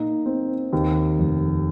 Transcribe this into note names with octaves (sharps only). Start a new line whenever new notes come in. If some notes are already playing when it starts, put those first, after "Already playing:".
Already playing: A#2 A#3 D#4
C4
D#2
F1